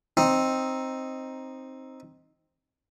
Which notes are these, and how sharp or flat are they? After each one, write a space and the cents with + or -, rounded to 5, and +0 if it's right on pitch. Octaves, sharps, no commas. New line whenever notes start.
C4 +10 D#4 +0